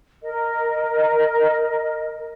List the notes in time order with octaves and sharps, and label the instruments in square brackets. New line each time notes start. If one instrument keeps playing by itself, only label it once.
[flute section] A#4 D#5